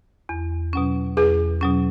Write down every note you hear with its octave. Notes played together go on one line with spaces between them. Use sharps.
E2
B2 F#3 C#4
E2 G#4 B4
B2 F#3 C#4